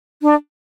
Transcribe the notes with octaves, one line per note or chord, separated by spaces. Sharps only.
D4